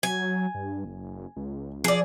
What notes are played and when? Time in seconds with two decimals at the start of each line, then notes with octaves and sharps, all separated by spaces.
0.03 F#3 G#5
0.54 G2
0.85 F#1
1.36 C#2
1.84 F3 G#4 D5